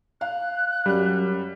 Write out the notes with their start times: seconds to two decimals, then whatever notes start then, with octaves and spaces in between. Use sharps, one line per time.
0.21 F5 F#6
0.86 F#2 G3